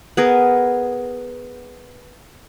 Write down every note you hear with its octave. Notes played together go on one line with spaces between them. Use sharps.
B3 G#4 A#4